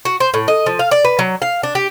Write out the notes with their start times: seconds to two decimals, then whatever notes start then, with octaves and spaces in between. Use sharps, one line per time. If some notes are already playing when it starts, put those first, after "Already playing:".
0.05 F#4
0.20 C5
0.34 A2
0.48 D#5
0.66 F3
0.79 F5
0.91 D5
1.05 B4
1.19 F#3
1.42 F5
1.63 D4
1.75 G4